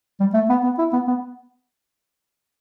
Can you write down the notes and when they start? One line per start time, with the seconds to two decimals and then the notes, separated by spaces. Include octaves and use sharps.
0.20 G3
0.34 A3
0.49 B3
0.63 B3
0.78 E4
0.93 B3
1.08 B3